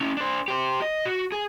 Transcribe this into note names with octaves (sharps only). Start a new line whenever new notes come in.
C#4 E4
D4 C5
G4 C5
D#5
F#4
G#4